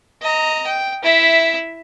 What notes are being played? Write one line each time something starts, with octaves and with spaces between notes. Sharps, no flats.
D#5 A#5
G5
E4 E5